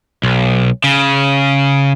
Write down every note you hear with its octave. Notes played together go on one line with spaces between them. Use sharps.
B1
C#3